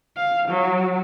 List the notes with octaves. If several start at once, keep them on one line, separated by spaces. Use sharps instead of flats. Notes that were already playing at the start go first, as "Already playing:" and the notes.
F5
F#3